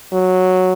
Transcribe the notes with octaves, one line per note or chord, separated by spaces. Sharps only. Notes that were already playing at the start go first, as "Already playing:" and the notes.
F#3